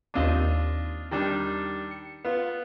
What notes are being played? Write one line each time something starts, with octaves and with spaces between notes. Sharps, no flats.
D#2 C4 D4 F4 D#5 D#7
D#3 G3 D4
C#7
B3 F4